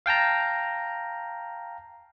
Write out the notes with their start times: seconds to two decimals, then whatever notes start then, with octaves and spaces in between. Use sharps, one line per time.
0.06 F5 G5 A5 A#5